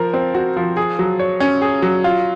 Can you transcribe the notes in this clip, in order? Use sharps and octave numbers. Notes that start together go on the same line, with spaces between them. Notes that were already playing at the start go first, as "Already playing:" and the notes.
Already playing: F3 A#4
C4
F#4
F3
G#4
F#3
C#5
C#4
G#4
F#3
F4